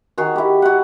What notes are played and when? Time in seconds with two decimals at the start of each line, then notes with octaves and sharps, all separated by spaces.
0.18 D#3 F#4 G#4
0.36 E4 G4
0.62 F#4 F#5